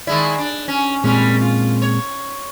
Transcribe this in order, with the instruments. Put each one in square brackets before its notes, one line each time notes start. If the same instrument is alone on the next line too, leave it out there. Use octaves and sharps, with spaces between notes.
[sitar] D#3 G#3 E4 [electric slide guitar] D5
[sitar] D4
C#4
[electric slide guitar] A#2 G#3 C4 [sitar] G3 C#4
[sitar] F4
C#5